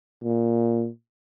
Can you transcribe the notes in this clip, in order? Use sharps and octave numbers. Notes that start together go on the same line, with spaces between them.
A#2